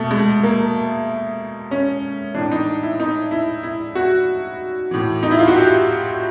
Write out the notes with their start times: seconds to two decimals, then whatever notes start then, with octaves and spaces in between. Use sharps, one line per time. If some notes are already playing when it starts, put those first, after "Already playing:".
Already playing: B2 A3
0.11 G#3
0.43 A#3
1.71 C#4
2.34 A2 E3 D4
2.51 D#4
2.83 E4
3.00 D#4
3.31 E4
3.63 E4
3.95 F#4
4.91 A2 E3
5.23 D#4
5.31 E4
5.39 F4
5.47 F#4
5.56 G4